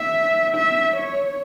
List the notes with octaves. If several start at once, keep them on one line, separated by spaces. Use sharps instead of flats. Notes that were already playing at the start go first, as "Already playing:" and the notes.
Already playing: E5
E5
C#5